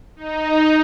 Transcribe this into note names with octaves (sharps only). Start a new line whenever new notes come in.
D#4